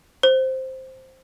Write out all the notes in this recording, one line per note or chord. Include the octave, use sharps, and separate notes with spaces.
C5